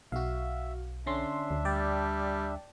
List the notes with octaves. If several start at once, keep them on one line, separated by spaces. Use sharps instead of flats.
B1 F#4 E5 F5
D3 C#4 D4 E5 C6
D2
G3 D5 G5 A5